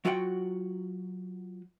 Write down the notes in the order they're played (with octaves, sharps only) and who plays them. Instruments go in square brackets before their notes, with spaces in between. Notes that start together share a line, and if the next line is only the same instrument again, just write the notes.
[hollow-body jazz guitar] F#3 F4 F#4 E5 F#5 G5